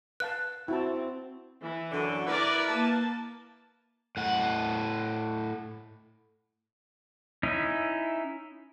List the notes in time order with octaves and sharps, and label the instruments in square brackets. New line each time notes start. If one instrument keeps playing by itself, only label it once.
[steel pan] B4 F5 A5 [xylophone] F#6
[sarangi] C4 [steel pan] E4 F#4 A5
[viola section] E3
[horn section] F#2 D3
[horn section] E4 B4 [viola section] A#4 D5
[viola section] A#3 A5
[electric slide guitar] A2 F#5
[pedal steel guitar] C#4 D#4 E4